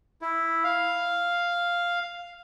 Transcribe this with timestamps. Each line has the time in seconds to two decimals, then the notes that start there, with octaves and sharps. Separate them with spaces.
0.21 E4
0.64 F5